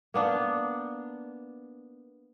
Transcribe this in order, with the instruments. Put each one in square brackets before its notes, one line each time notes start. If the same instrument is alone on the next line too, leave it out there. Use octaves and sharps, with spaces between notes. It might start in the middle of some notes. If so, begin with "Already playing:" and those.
[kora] A#3 B3 D4